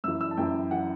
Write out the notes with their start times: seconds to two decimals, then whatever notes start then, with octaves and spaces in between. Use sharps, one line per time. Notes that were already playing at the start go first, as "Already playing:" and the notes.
0.04 F#2 E6
0.08 E3
0.21 E6
0.31 A5
0.37 F#2 E3 G5
0.71 E3 F#5